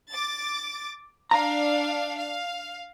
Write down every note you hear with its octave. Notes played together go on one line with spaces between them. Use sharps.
D6 A6
D4 F5 A#5
F5